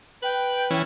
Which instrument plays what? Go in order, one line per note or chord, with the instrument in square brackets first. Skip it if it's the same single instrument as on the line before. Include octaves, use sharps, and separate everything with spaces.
[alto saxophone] B4 [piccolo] G5
[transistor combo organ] E3 C#4